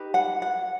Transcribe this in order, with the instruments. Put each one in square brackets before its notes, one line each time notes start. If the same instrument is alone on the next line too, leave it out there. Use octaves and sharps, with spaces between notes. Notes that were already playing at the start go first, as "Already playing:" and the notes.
Already playing: [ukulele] D#4 G4 B4
F#5
F#5